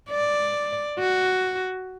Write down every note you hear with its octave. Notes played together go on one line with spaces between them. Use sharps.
D5
F#4